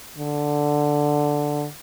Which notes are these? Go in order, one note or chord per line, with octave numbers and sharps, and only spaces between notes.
D3